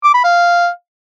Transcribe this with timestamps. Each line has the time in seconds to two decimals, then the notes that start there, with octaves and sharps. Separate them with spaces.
0.04 D6
0.14 B5
0.24 F5